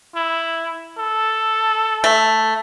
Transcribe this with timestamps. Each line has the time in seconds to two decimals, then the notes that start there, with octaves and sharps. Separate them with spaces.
0.15 E4
0.98 A4
2.04 A3